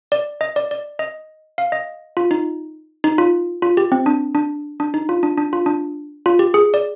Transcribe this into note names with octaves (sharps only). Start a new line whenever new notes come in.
D5
D#5
D5
D5
D#5
F5
D#5
F4
D#4
D#4
F4
F4
G4
C4
D4
D4
D4
D#4
F4
D4
D4
F4
D4
F4
G4
G#4
D5